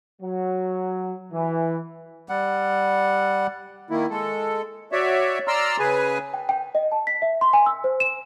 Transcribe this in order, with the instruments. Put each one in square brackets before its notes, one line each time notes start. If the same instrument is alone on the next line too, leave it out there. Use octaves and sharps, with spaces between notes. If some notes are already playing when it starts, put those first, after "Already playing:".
[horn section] F#3
E3
[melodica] G3 F#5
[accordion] D#3 A#3 E4
G#3 A4
F#4 C#5 D5 E5
D5 A#5 C6 E6 F6
C#3 G#4 B4 G#5
[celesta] G5
G5
D#5
A5
B6
E5
C6
G#5
E6
C5
E7